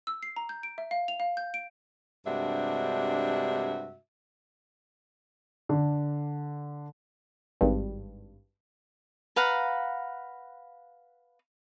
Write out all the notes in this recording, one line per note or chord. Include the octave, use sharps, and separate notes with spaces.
E6
C7
A#5
G6
D7
E5
F5
F7
F5
G6
D7
G2 C3 G#3 D4 F#4 E5
D3
G#1 G2
B4 F5 F#5 A#5